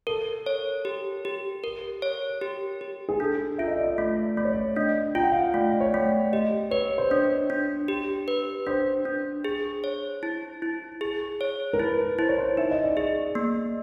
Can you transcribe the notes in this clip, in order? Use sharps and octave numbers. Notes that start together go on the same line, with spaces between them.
A4 A#4
C#5
G4
G4
A#4
C#5
G4
G4
G#4
D4 A4
F4 E5
D#5
D5
D#5
A3 D5
A3 D5
C#5
D5
D4 D#5
F4 G5
F#5
F5
F#5
A3 D5
D5
C#5
A3
D5
G4 D#5
B4 C#5
C5
D4 C#5
D4
G4
B4
D4 C5
D4
G#4
C#5
E4
E4
G#4
C#5
A#4
E4 B4
E4 C5
C#5
C5
D#4 E5
D#5
D5
G#4 D#5
A#3